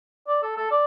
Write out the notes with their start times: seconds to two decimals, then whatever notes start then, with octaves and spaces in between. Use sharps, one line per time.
0.27 D5
0.42 A4
0.57 A4
0.71 D5